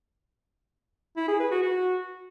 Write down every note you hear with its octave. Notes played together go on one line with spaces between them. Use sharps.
E4
G#4
B4
F#4
F#4